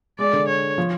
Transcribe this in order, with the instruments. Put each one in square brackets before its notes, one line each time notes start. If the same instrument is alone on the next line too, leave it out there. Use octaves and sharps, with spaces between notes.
[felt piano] G#3 [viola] D5
[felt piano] D3
[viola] C#5
[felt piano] F3